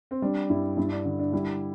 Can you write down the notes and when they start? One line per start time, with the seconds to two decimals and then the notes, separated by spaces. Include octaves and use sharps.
0.11 C4
0.22 G3 D4
0.50 G2 E4
0.77 G2 E4
0.92 D4
1.05 D3
1.19 D4
1.33 G3 E4